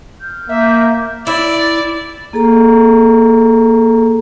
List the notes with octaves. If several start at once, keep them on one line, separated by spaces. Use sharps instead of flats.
F6 G6
A#3 E5
E4 D5
A#3 G#4 A4 A#5